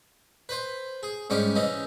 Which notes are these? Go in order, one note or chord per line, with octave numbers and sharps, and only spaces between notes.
B4 C5
G#4
G#2 G3 C#4 D6
E3 C#4 D#4